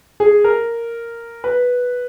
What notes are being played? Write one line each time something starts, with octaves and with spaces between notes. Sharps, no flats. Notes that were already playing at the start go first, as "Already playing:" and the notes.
G#4
A#4
B4